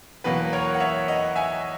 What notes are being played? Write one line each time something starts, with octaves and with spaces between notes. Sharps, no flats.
E2 B2 F#3 A#3 B4
A#4 C#5
F#5
C#5 E5
D#5 F#5
E5 G#5